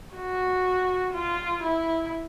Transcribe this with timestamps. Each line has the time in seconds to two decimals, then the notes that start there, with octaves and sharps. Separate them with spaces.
0.15 F#4
1.14 F4
1.63 E4